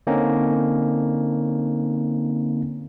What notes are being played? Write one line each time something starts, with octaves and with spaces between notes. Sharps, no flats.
D3 A#3 C4 C#4 D#4